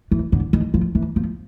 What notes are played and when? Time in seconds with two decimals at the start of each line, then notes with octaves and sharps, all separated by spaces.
0.11 E3
0.32 D3
0.53 D#3
0.74 F3
0.95 E3
1.16 F3